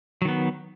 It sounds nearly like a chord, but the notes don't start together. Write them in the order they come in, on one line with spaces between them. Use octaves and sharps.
F#3 D#3 B3